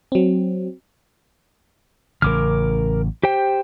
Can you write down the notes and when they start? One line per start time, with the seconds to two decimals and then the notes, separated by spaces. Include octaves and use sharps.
0.12 F#3 C4
2.22 A1 C#3 A#4 D6 F6
3.23 G4 C5 G5